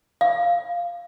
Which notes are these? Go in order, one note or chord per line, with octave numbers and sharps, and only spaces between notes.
F5